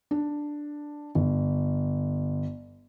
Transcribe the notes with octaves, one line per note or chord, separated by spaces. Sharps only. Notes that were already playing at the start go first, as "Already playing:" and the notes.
D4
G1